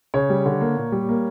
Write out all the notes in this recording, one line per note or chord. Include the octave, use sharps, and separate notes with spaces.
C#3 C#5
G3
D3
A#3
A#2
G3
A#3